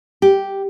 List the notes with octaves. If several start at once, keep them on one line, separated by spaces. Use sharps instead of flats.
G4